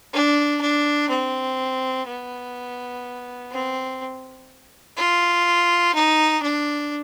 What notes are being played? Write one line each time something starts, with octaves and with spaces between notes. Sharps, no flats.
D4
D4
C4
B3
C4
F4
D#4
D4